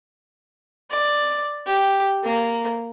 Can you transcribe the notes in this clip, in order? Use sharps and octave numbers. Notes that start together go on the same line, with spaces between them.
D5
G4
A#3